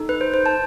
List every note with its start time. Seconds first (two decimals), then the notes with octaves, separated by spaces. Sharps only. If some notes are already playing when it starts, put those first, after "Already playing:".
Already playing: D#4 A4
0.09 B4
0.21 C5
0.34 C5
0.46 A5